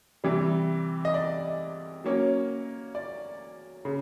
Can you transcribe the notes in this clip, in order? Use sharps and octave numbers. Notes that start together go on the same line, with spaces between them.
C3 E3 G3
D#5
D5
F#3 A#3 C#4
D5
C#3